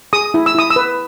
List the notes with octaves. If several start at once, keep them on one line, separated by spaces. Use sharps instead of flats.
G#4 D#6
E4
E6
E4 D#6
E6
B4